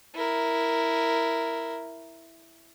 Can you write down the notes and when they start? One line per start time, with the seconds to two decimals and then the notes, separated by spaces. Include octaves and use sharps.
0.14 E4 A#4